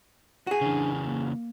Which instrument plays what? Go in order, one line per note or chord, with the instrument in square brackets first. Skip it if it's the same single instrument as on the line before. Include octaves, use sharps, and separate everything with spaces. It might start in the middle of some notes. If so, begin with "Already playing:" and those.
[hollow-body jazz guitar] F#4 G#4
[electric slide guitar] C#3 E3 [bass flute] D4
[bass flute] A#3